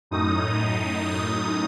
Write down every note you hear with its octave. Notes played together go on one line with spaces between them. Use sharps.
F#2 A2 D#4 D#6